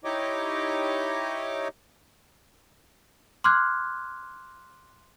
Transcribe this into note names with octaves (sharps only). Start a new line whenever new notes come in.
D#4 E4 G4 C#5 D#5 D6
C6 D6 F6 F#6 G#6